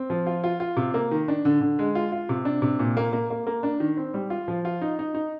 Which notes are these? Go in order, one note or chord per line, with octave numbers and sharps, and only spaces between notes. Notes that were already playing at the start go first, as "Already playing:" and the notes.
Already playing: C4
F3
F4
F4
F4
C3
A#3
D#3
D4
D3
D3
G#3
F4
F4
C3
D4
C3
A#2
A#3
A#3
A#3
A#3
D4
D#3
C4
G3
F4
F3
F4
D#4
D#4
D#4